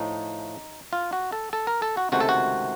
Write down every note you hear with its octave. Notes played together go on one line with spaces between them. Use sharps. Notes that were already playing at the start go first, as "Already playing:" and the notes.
Already playing: A2 F3 A3 D#4
F4
F#4
A4
A4
A#4
A4
F#4
C#2 C3 D#3 A3 F#4
A4
F#4